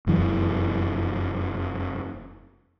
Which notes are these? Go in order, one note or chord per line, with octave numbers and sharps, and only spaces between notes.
F1 F#2 E3